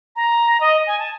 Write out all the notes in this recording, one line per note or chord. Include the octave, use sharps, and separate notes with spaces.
A#5
D#5
G#5
A5